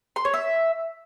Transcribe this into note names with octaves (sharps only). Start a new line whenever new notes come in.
C6
C#5
E5